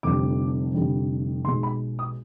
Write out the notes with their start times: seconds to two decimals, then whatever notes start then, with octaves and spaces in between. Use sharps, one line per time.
0.03 F1 F2 D3 G3 D6
0.74 F1 F2 D3 G3
1.45 B1 B2 G#3 C6
1.63 B5
1.99 D#6